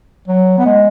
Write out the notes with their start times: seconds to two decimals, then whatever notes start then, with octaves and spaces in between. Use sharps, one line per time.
0.28 F#3
0.58 B3
0.66 G#3